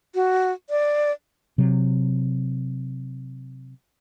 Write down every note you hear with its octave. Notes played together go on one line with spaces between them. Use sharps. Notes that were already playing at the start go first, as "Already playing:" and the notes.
F#4
D5
C3 F#3